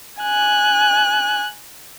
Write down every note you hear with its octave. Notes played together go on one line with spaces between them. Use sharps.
G#5 F#6